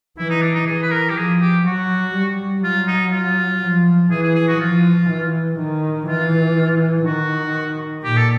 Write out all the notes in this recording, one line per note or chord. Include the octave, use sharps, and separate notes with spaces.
E3 E4
D#4
D4
D#4
E3 G#4
B4
A#4
G4
F3 G#4
G4
F#3 F#4
G3
F#3 F4
D#4
F4
F3
E3 G#4
G#4
G#4
F#4
F3 F4
E3
D#3
E3 F4
D#3 F#4
A#2 G4
A4